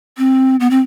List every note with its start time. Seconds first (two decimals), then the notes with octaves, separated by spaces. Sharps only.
0.18 C4
0.60 B3
0.71 C4